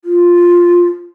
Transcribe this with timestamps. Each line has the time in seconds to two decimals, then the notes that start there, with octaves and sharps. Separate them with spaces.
0.05 F4